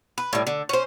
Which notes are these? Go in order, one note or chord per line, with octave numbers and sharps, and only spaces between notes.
B4
A2 G3
D3
C#4 C5